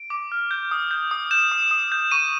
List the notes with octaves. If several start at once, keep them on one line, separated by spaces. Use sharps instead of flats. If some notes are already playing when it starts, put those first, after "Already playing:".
Already playing: D7
D6
F6
G6
D#6
G6
D#6
G6 E7
D#6
D#6
G6
C#6 D#7